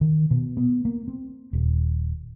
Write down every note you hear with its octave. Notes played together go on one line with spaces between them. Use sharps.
D#3
B2
B3
A#3
C4
D#1